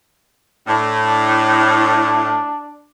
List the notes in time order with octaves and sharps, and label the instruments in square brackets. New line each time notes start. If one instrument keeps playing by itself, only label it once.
[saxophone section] A2 [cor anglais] D4
[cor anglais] D4